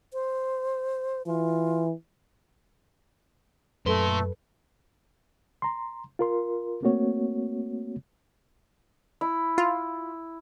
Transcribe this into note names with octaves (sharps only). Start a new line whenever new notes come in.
C5
E3 F4
F#2 A#2 A3 A4 B4 C6
A#5 C6
F4 A#4 C6
A3 A#3 C4 F#4 C#5
E4
F4